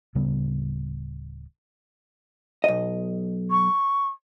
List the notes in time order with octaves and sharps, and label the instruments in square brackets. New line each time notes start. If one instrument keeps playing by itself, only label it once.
[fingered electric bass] D1 C#3 G3 B3
[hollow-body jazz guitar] B1 D#5
[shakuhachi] C#6